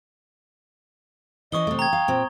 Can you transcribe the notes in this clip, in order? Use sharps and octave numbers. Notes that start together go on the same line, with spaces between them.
E3 C#4 D#5 C#6 D#6 G7
C3 A3
G5 A#5 G#6
F5
A#2 C4